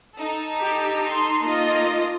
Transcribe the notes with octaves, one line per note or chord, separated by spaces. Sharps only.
D#4 A4
G4
C6
A#3 F4 D#5